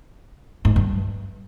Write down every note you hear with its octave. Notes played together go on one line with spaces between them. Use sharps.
G#2
G2